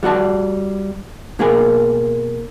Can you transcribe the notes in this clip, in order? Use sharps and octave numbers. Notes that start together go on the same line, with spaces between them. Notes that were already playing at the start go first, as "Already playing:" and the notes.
G3 F#4 D5 A5
B2 A#3 G#4 A#4 G#5